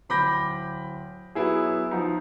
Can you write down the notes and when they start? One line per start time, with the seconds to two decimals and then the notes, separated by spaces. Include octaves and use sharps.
0.09 D1 B5 D6 G6 A#6
1.35 F#3 B3 E4 G#4
1.91 F3 D#4